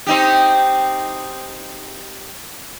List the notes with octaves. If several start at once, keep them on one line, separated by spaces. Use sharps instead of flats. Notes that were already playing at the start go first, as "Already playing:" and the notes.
C4 D#4 G4